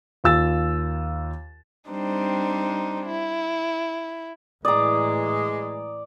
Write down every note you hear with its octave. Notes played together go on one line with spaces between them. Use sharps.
D#2 F4 E6 A6
G3 C4 D4 D#4 C5
E4
A2 E3 G#3 D5 A#5 D#6